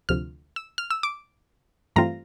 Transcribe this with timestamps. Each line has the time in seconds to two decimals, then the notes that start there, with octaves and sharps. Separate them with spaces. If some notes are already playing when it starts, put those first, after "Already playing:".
0.09 D2 C3 F3 F6
0.56 E6
0.78 F6
0.91 E6
1.03 D6
1.96 G2 E3 A3 C4 F4 A#5